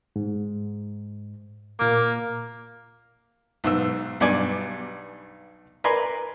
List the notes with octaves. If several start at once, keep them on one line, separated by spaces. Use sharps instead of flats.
G#2
A#2 A#3 D6
B1 G#2 E6
B1 G2 B2 D5 G#5 D6
A#4 B4 D5 G#5 A#5 C6